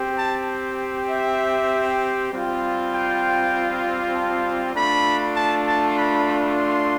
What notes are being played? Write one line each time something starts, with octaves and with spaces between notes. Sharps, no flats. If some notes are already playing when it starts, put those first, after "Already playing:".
Already playing: C4 G4
A5
E5
G3 C4 F4
G5
A5
A3 D4 F4 B5
A5
A5
B5
C6